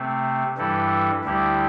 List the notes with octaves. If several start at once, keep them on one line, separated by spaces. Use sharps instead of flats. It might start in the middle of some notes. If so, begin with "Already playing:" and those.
Already playing: C3 A3 C4
G2 E3 G3 E4 A4
D2 D3 G3 E4 G4